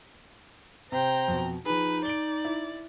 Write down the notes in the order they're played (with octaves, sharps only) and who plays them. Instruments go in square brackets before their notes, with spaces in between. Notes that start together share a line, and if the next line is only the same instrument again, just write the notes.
[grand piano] C3 [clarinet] C5 [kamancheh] G5 A#5
[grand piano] F2 B2
[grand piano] F3 G#4 [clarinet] D#4 [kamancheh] B4
[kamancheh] D5 [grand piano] D7 G7
[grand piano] E4